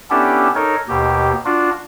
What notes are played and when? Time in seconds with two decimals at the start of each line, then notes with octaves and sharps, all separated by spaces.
0.10 B3 C#4 D4 E4 G4 A4
0.55 D#4 A4 A#4 C#5
0.89 D#2 B2 G4
1.45 D4 F4 F#4